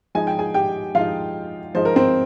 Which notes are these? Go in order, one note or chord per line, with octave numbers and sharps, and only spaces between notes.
F3 G#3 D#4 G#5
G5
G#4 G#5
G4 G5
F3 G#3 D#4 F4 F5
F3 G#3 D#4 C5
A#4
C4 C5